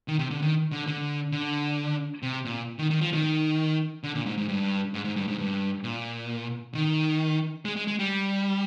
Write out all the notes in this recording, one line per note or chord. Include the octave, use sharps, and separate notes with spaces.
D#3
C3
D3
D#3
D3
D3
D3
C3
A#2
D#3
D#3
F3
D#3
D3
A#2
G#2
G#2
G2
G#2
G#2
G2
G#2
G2
A#2
D#3
G#3
G#3
G#3
G3